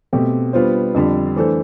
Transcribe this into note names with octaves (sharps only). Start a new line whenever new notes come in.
B2 A3 C4 G4
G3 B3 D4 F4 C5
F2 D3 G3
E3 A3 D4 A4 C5